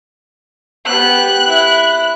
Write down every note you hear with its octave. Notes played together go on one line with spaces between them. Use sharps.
B3 G4 F#6
E4